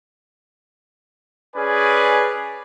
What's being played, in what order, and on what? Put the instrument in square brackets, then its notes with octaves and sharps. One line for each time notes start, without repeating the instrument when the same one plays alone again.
[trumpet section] C#4 G#4 B4 D5 G#5